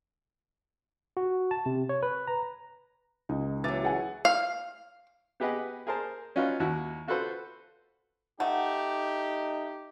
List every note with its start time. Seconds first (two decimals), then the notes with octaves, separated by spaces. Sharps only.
1.17 F#4
1.51 A5
1.66 C3
1.89 C#5
2.03 B4
2.27 A#5
3.29 C#2 D#4
3.64 E3 F#3 D6 A6
3.83 G#4 F#5 G#5
4.25 F5
5.40 B3 G4 G#4 B4 D#5 F#5
5.87 G#4 A#4 C5 A5
6.36 C#4 D#4 F4 F#4 B4 C#5
6.60 D#2 E4 F#4
7.07 F4 F#4 A4 B4 C5
8.40 A3 D#4 G4 F#5